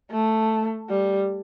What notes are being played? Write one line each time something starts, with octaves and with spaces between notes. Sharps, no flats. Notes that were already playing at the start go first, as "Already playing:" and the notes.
A3
G3